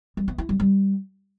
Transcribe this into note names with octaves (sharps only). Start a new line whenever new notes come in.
G3
B3
E4
G3
G3